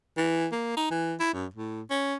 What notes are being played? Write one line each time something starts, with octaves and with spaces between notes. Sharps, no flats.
E3
A#3
D#4
E3
E4
F#2
A2
C#4